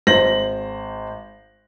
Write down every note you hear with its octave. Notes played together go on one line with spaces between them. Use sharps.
G#1 C5 A#6 F#7